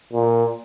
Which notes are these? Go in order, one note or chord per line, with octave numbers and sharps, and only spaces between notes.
A#2